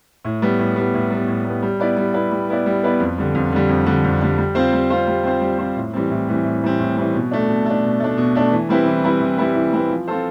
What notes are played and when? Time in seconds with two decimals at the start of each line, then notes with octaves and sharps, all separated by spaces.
0.25 A2
0.42 G3 B3
0.59 A2
0.76 G3 B3
0.94 A2
1.11 G3 B3
1.28 A2
1.45 G3 B3
1.62 G3
1.80 B3 E4 B4 D5
1.97 G3
2.14 B3 E4 B4 D5
2.32 G3
2.49 B3 E4 B4 D5
2.66 G3
2.83 B3 E4 B4 D5
3.00 F2
3.18 D3 G3
3.35 F2
3.52 D3 G3
3.69 F2
3.86 D3 G3
4.04 F2
4.21 D3 G3
4.38 G3
4.55 C4 F4 C5
4.73 G3
4.90 C4 F4 C5
5.07 G3
5.24 C4 F4 C5
5.41 G3
5.58 C4 F4 C5
5.76 A2
5.93 E3 G3 C4
6.11 A2
6.28 E3 G3 C4
6.44 A2
6.62 E3 G3 C4
6.80 A2
6.97 E3 G3 C4
7.14 B2
7.31 A3 D4
7.48 B2
7.66 A3 D4
7.83 B2
8.00 A3 D4
8.17 B2
8.35 A3 D4
8.52 E3
8.69 G3 C4 E4 B4
8.86 E3
9.04 G3 C4 E4 B4
9.21 E3
9.38 G3 C4 E4 B4
9.55 E3
9.73 G3 C4 E4 B4
9.90 F3
10.08 C4 F4 A4 C5